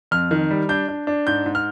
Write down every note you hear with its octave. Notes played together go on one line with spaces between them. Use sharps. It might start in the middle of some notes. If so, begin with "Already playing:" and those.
F2 F6
D#3
G3
D4 G6
D4
D4
G#2 G6
G#2
F6